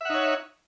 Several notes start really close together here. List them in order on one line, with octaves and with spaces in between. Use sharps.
E5 F#5 D#4 C#5